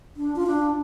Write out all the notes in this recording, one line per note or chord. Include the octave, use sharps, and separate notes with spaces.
D4
F4
D4